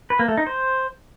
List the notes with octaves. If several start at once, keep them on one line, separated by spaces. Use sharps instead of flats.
B4
A#3
A3
D#4
C5